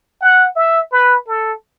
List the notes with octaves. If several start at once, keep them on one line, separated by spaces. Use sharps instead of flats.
F#5
E5
B4
A4